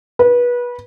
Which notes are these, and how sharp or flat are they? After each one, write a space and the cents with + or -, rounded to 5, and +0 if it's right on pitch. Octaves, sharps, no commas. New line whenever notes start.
B4 -25